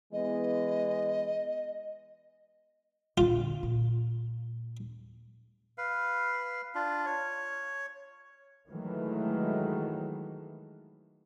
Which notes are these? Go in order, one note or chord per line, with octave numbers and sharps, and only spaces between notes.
E3 G#3 B3 D#5
A#1 D3 F4
A#2
B4 F5
D4 F4
C#5
D#3 E3 F#3 G#3 A3